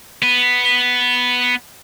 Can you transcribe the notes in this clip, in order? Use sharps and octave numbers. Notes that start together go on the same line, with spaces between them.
B3 B4